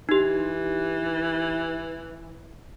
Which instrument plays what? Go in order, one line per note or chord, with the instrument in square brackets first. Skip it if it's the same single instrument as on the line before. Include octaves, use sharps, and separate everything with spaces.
[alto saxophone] E3 [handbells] D#4 G4